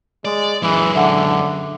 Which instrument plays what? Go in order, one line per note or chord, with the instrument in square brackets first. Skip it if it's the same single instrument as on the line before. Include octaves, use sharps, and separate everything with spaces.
[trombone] G#3 [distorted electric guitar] D5
[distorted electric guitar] F#2 G#3 [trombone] E3
[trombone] D3 [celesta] E5 F#5